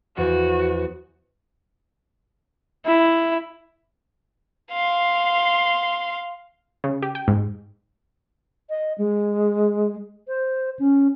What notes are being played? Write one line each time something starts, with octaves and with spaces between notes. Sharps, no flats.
E2 F3 F#4 F#5
E4
F5 C6
C#3
G4
G5
G#2
D#5
G#3
C5
C#4